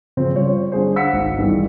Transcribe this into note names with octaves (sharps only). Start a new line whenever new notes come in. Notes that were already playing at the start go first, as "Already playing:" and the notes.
C#3 F3 C4
G3 F4 C#5
D3 G3 G#4 C5
F5 F#5 E6 B6 C#7
G#1 G#2
G2 D#3 E3 G3 G#3